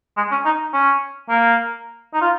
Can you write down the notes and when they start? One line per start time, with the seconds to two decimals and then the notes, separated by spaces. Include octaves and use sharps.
0.17 G#3
0.31 C#4
0.45 D#4
0.73 C#4
1.30 A#3
2.14 D#4
2.21 F4